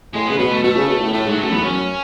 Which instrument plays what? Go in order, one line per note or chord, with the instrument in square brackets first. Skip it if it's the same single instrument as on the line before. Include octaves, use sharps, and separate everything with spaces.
[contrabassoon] A2 [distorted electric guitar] G#3
[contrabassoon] C#3 [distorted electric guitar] B3
[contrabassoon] B2 [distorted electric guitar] B3
[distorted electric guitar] A3
[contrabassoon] B2 [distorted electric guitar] A3
[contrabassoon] C#3
B2
A2
[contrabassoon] A2 [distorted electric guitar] A3
[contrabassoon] G#2 [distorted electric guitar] F#3
[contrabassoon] F#2 [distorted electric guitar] A3
[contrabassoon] E2 [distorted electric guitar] B3
[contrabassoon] F#2 [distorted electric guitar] C#4